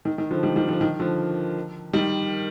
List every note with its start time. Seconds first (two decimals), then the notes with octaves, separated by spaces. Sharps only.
0.05 D#3
0.18 D#3
0.31 D3 F3
0.43 D#3 G3
0.56 D#3 G3
0.68 D3 F3
0.81 D#3
1.00 D3 F3
1.93 D#3 G3